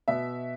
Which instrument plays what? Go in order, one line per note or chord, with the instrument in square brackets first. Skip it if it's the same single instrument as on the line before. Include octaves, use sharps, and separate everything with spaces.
[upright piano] B2 E5